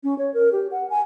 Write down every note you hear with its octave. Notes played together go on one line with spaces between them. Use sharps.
C#4
C#5
A#4
G4
F#5
G#5